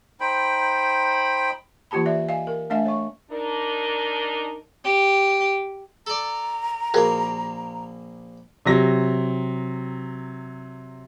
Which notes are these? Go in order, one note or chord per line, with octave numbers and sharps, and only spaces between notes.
D#4 C5 G5 B5
E3 A#3 F4 G4 A5 B5
B4 D5 E5
D#5 F5 G#5
A#4
A3 D4 D#5 E5 G#5
C#5 C#6
D4 D#4 A#4
G4
A4 D5 A#5
A#1 A#3 F#4 G#4 A#4
C3 F#3 A#6